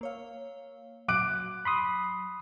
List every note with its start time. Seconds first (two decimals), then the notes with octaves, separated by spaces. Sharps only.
0.01 A#3 C#5 F5
1.08 F#3 D6 F#6 D7
1.65 B5 C6 D#6